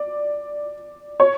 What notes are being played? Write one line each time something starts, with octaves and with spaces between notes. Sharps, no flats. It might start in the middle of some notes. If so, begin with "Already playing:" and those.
Already playing: D5
C#5